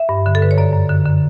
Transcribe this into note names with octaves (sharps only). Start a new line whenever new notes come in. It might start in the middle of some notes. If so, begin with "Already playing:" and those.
Already playing: E5
G2
D3
A4
D3 B4
C#5
F#2 D5
F#2
D3
D3